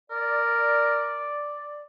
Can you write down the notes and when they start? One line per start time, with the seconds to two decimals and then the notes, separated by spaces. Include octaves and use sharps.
0.11 A#4 D5